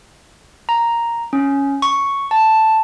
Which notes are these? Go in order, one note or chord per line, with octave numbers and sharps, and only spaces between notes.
A#5
C#4
C#6
A5